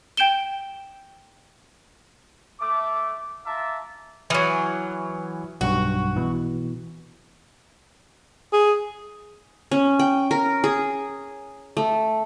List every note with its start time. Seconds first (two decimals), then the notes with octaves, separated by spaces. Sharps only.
0.17 G5 G6 D7 E7 G7
2.60 A3 D6
3.46 F4 E5 A5 A#5 D6
4.30 E3 F#3 G#5 D#6 F6
5.61 B1 G2 F#4
6.16 B2 E3
8.53 G#4
9.71 C#4
9.99 G5
10.31 A#4
10.64 G#4
11.77 A3